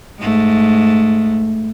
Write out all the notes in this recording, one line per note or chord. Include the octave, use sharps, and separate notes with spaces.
G#2 A3